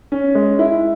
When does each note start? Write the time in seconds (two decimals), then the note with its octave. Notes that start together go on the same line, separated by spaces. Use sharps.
0.12 C#4
0.35 G#3
0.59 E4